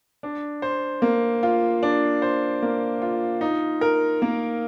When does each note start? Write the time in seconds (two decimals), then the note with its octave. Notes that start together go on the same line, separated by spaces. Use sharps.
0.23 D4
0.62 C5
1.02 A#3
1.43 F4
1.83 D4
2.22 C5
2.62 A#3
3.02 F4
3.41 D#4
3.81 A#4
4.22 A#3